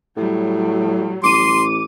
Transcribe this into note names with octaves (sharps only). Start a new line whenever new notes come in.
A2 F#3 G3
A1 C6 D6 D#7